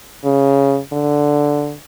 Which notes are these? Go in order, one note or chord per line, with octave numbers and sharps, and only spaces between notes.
C#3
D3